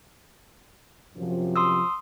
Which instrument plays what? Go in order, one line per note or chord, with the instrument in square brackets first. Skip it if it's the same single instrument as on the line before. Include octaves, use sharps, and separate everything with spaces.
[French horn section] F#2 C3 F3
[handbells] C6 D#6 E6